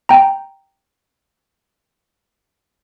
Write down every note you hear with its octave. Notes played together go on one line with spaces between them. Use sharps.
G5 A#5